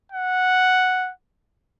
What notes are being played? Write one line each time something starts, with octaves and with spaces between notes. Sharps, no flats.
F#5